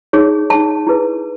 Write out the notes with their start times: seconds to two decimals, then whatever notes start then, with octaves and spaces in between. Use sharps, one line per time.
0.13 D#4 G#4 C#5
0.50 D#4 G#4 C#5 A5
0.87 E4 G#4 B4